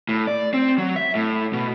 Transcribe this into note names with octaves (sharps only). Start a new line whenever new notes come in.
A2
D5
C4
F#3
E5
A2
B2